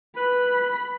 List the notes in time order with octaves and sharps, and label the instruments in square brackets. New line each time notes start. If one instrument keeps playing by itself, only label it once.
[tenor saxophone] B4 [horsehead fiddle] B5